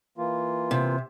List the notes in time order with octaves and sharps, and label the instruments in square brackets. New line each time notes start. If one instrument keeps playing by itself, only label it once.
[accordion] E3 A#3 F4
[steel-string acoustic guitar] C3